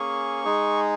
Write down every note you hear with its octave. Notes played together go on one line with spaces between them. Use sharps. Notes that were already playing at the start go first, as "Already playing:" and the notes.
Already playing: A#3 C#4 G#4 C#6
G#3 D#4 G#4